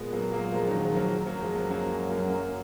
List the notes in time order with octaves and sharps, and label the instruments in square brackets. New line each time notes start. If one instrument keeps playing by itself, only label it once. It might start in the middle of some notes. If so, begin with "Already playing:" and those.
Already playing: [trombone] A#2 [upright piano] G#3 B3
[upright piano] F#3 A#3
F#3 A#3
F3 G#3
D#3 F#3
F3 G#3
F#3 A#3
F#3 A#3
[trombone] F#2 [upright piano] F3 G#3
[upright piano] F#3 A#3
F#3 A#3
F#3 A#3
F#3 A#3